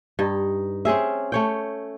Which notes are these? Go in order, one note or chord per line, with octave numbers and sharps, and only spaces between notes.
G2 D#4
C4 C#4 G#4 E5
A3 C#5 G5